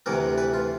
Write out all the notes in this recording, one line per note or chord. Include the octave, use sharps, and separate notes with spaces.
D2 C3 E3 A#4
B4
F4